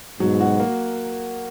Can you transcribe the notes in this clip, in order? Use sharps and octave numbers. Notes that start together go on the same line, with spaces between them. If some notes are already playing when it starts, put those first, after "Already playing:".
G#2 B2 F#3
F#4
A#3